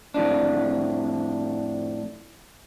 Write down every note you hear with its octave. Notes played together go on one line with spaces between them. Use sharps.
F2 A2 D4